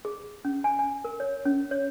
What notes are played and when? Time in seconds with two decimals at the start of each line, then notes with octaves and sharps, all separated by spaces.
0.05 G#4
0.45 C#4
0.64 G#5
0.79 G#5
1.04 A#4
1.20 C#5
1.45 C#4
1.71 C#5